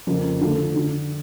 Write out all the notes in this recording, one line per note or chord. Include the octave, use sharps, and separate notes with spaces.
F2 C#3 F3 A#3
D3 F3 A3
D3